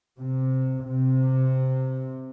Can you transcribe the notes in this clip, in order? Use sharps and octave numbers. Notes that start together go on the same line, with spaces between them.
C3
C3